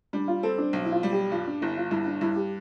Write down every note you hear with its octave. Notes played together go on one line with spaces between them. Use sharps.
G3 D4
F4
C4 A4
D4
B1
E4
F4
G3
G4
G2 F4
D4
G1 E4
F4
G2 E4
D4
G2 E4
G4